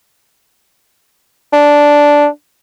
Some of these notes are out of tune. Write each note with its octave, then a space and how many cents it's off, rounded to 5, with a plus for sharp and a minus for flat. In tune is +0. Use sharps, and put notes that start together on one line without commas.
D4 -5